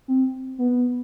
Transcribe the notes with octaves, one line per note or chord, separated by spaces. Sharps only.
C4
B3